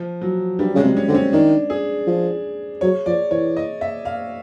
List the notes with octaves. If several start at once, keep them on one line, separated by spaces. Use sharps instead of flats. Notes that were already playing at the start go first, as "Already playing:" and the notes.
Already playing: F3
F#3
G2 G3
C#3 G#3
C3
C#4
D3 C4
C#4
D#3 D4
G#4
F3
F#3 C#5
F3 D5
E3 C#5
D#5
E5
F5